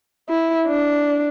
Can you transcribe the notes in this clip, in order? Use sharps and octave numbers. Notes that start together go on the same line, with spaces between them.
E4
D4